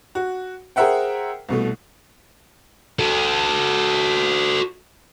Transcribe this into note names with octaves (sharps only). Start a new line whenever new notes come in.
F#4
G#4 A#4 C5 E5 F#5 G5
C2 B2 A3
F#4 A4